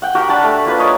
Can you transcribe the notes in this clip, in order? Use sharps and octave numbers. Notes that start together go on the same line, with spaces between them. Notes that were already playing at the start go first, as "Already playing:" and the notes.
F#5 G5
F#4 G4 A#4
D4 A5 B5
A3
A#3 F4 B4
A#4 C#5 D#5